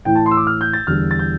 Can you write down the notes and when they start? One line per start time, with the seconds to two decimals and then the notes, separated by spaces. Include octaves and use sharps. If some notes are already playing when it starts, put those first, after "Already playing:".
0.05 A2 E3 A3 G5
0.16 A5
0.26 C6
0.31 E6
0.37 D6
0.47 F6
0.61 G6
0.73 A6
0.87 E2 D3 G3 F6
1.11 A6
1.19 G6